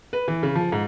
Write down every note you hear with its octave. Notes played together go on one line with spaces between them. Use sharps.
B4
E3
C#3
F3
G#2